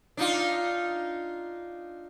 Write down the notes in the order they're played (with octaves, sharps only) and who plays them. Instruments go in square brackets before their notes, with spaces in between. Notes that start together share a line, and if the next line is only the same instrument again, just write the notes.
[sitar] D4 D#4 F4